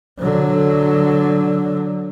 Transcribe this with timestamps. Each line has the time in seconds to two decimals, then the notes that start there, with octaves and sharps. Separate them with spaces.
0.19 D3 F#3